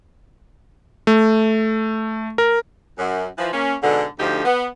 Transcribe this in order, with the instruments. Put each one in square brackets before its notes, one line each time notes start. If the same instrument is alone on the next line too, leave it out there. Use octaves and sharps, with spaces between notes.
[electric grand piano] A3
A#4
[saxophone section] F#2
E3 F3
A#3 C#4
G#2 B2 D3
D2 D3 F3 D#4 G4
B3